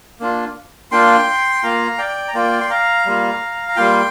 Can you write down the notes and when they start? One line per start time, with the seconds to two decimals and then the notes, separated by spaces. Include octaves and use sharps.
0.20 A#3 D4 F4
0.92 A#3 D4 F4 G5 C6
1.63 A#3 F4 F5 A#5
1.98 D5 G5
2.28 A#5
2.34 A#3 F4 D5 G5
2.61 C6
2.70 F5 A#5
3.06 G3 A#3 F4
3.68 A#5
3.76 G3 A#3 F4 G5 C6